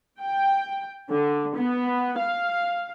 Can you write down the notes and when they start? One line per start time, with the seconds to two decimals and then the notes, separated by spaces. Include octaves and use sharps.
0.21 G5
1.10 D3
1.55 B3
2.18 F5